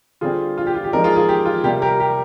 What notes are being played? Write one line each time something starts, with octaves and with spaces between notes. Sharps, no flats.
D3 G3 C4 F4 G#4
F4
G4
F4
G4
F3 G#3 C4 D#4 A#4 D5
F4 G#4
F4 G#4
G4
F4
C3 G3 A#3 G4
G4 A#4
G4